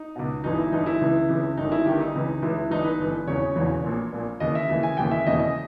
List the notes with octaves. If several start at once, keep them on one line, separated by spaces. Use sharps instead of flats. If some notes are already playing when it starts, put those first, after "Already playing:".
Already playing: D#4
C#2 B2
G1 G2 E3 D#4
E4
G1 G2 E3 D#4
E4
C#2 C#3 E3
C#2 C#3 E3
G1 G2 D#3 D#4
E4
G1 G2 D#3 G4
D#4
C#2 C#3 E3
C#2 C#3 E3 E4
G1 G2 E3 D#4
B4
G1 G2 E3
E1 E2 C#3 E3 C#5
E1 E2 C#3 E3
A#1 A#2
A#1 A#2
D#2 C#3 E3 D#5
E5
D#2 C#3 E3
G#5
E1 D#2 C#3 E3 G5
E5
E1 D#2 C#3 E3 D#5
D#5